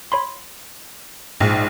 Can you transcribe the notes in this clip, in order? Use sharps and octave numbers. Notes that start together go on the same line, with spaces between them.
C#5 B5 C6
A#1 G#2